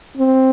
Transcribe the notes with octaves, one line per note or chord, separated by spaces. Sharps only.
C4